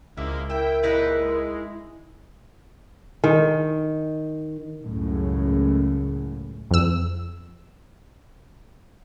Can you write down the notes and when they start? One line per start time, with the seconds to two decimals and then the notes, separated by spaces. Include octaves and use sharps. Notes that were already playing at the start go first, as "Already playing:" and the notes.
0.17 C#2 F3 G#3 A#3 E4
0.50 E4 A#4 E5 G5
0.83 A#2 D#4 E4 G#4 B4
1.21 G#3
3.24 D#3
4.82 C#2 F#2 A2 C#3
6.71 F2 E6